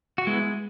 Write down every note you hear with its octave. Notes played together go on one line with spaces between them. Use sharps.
F#4
G#3 B3 E4